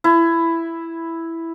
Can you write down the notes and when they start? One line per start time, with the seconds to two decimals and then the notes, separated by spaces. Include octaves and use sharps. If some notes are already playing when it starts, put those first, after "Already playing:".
0.04 E4